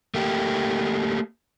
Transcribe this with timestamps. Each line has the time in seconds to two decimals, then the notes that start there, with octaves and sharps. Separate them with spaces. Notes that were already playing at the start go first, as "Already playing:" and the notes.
0.14 A3 A#3 G4